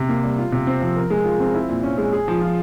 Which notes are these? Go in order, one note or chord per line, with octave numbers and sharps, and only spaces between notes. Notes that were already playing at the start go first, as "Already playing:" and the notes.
Already playing: C3
A#3
G3
F4
C3
C4
F3
A#4
G#3
F4
C4
E4
A#2
C#4
G#3
G#4
F3
F4